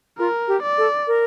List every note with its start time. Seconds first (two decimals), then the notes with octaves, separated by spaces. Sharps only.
0.18 F4 A#4
0.48 G4
0.62 D5
0.78 A4
1.07 A#4